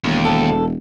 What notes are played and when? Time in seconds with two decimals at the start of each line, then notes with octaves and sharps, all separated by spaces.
0.04 E1 D#2
0.25 D2 A4